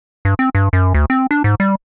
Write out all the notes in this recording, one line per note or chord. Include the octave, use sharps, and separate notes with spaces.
G2
C4
G2
F#2
D2
C4
D4
G#2
G3